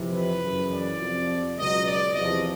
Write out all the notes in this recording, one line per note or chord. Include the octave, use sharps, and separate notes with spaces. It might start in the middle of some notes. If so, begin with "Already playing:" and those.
Already playing: F2 C3 E3
B4
F#2 C#3 E3
D5
F2 C3 F3
C#2 B2 F#3 D#5
D5
E2 C3 F3 D#5